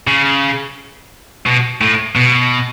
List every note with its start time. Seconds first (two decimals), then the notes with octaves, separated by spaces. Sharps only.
0.07 C#3
1.46 B2
1.81 A2
2.16 B2